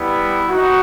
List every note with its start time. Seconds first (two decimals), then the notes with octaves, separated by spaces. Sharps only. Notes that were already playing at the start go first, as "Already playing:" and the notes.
Already playing: G3 B3 E4
0.49 D#4 F#4